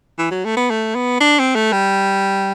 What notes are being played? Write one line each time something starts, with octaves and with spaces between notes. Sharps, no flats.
E3
F#3
A3
B3
A3
B3
D4
C4
A3
G3